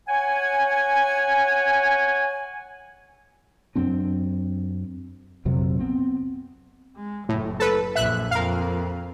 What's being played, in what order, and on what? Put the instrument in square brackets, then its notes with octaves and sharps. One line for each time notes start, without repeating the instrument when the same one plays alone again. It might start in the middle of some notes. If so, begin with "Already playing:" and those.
[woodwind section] C#5 F#5 G#5
[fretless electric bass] F#2 F#3 C4 D4
A#1 F2 C3 F#3
B3 C4
[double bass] G#3
[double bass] F#1 [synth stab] A2
[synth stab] A4 B4
[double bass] A#1 F#2 [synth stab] E5 F#6
[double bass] F2 [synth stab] A#4 F5